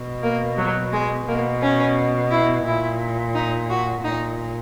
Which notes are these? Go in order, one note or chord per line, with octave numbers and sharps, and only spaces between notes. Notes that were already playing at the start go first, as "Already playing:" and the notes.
Already playing: B2
A#3
F#3
G#3
B2 A#3
C#4
E4
A#2 E4
D#4
F#4
A#2 D#4